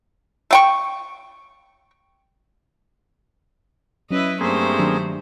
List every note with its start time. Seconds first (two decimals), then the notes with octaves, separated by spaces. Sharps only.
0.51 A3 G5 C#6
4.11 F#3 C#4 E4 B4 D#5
4.41 G2 A3 A#3 C4 G#4 C5
4.79 D#3 F#3 D4